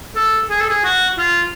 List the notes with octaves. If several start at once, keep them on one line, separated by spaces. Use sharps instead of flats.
A4
G#4
A4
G#4
F#4
F4